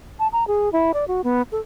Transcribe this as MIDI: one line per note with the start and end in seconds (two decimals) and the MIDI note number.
0.19 0.27 81
0.32 0.47 82
0.47 0.72 68
0.73 0.92 64
0.94 1.07 74
1.08 1.21 66
1.24 1.42 59
1.52 1.60 69